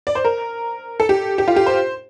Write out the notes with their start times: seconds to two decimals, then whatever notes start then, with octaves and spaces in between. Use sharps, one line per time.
0.07 D5
0.15 C5
0.25 A#4
1.00 A4
1.09 G4
1.38 G4
1.48 F4
1.56 G4
1.66 C5